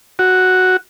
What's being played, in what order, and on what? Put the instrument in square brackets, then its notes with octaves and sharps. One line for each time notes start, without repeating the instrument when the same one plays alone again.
[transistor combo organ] F#4